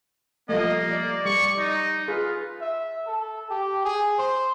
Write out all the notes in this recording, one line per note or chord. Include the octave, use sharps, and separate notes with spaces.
F3 G3 A3 A#3 D#5
D5
G3 C#6
D#4
F4 G#4 B4
E5
A4
G4
G#4
C5